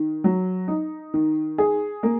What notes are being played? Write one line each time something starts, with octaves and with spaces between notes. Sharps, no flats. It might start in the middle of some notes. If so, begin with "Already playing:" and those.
Already playing: D#3
F#3
D#4
D#3
G#4
A#3